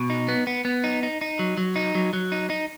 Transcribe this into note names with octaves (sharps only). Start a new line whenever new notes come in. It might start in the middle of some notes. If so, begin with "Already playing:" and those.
Already playing: B2
D#4
B3
B3
B3
D#4
D#4
D#4
F#3
F#3
D#4
F#3
F#3
D#4
D#4